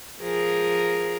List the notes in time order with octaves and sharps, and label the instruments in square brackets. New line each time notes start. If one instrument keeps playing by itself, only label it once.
[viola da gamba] F3 G#4 A#4